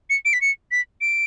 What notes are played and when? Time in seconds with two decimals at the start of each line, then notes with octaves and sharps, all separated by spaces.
0.10 C#7
0.25 D7
0.33 B6
0.41 C#7
0.71 B6
1.01 D7